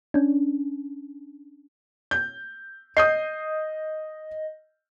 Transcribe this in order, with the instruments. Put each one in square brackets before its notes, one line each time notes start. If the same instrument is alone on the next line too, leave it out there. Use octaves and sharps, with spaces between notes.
[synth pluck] C#4 D4
[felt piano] G6
[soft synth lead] D#5 [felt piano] D#6 G6 C7